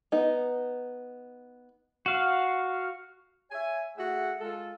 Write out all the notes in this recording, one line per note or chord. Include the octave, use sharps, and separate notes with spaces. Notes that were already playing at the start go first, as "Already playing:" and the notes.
B3 D#4
F#4 F5
C#5 E5 G#5
A3 F#4 G#4 E5 F#5
G#3 F4 A4